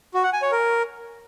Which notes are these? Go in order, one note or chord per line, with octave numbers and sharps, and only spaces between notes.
F#4
F#5
G#5
C#5
A#4